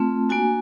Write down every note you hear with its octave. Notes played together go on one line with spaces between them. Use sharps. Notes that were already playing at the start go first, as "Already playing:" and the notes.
Already playing: A3 C4 F4 A5
A#3 D4 F#4 G#5